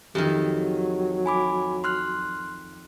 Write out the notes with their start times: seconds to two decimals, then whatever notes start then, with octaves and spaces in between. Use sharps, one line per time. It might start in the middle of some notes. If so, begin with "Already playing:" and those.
0.15 F2 D#3 F#3 G4
1.26 G#5 B5 D6
1.84 C6 F6 F#6